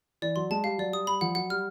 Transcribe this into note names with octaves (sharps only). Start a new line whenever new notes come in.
E3 D5
F#3 C6
G#3 A5
G3 F5
F#3 D5
G3 D#6
G3 B5
F3 F#5
F#3 F#5
G3 F6